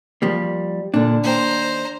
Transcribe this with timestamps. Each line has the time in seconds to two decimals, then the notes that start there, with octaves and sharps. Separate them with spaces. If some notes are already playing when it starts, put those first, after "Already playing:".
0.22 F3 G3 A#3
0.94 A#2 D3 D4
1.24 D#2 C5 G5 A#5